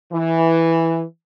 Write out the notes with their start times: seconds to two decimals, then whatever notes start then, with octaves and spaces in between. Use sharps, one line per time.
0.13 E3